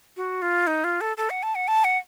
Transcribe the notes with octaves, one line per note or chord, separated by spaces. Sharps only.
F#4
F4
D#4
F4
A4
A4
F#5
A5
F#5
A5
F#5